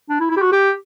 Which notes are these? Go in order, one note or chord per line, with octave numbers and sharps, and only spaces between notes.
D4
E4
E4
G4
F#4
G4